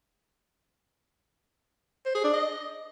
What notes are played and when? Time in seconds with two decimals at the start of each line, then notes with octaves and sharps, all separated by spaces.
2.05 C5
2.15 G#4
2.24 D4
2.33 D#5